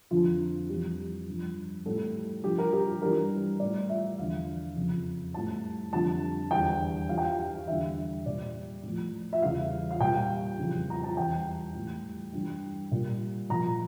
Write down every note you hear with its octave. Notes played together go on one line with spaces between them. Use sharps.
F2 D3 F3 F4
F2 E3 G3 G4
G2 F3
A2 G3 A4
G2 F3 G4
A#4
G4
G2 E3 G3 A#4
A2 G3 D5
E5
E2 D3 F3 F5
F2 C#3 F3
A2 G3 A5
F2 D3 G3 A5
E2 D3 G3 G5
G2 E3 G3 F5
G5
F5
E2 D3 G3 E5
A#2 G3 D5
A2 F3
E5
E2 C#3 E3 G3 F5
F5
A#2 G3 G5
F2 C#3 E3 G3
A#5
A5
E2 E3 G3 G5
A2 E3 G3
G2 E3 G3
A#2 G3
A#2 F3 A#5